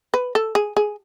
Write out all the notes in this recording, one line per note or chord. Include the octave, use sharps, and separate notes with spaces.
B4
A4
G#4
G#4